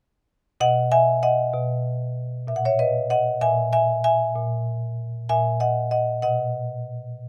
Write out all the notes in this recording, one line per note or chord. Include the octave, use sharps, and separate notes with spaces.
B2 D#5 F#5
E5 G#5
D#5 F#5
B2
A#2 E5
F#5
C#5 E5
B4 D#5
D#5 F#5
A#2 E5 G#5
E5 G#5
E5 G#5
A#2
A#2 E5 G#5
D#5 F#5
D#5 F#5
B2 D#5 F#5